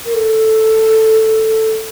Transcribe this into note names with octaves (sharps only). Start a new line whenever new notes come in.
A#4
A4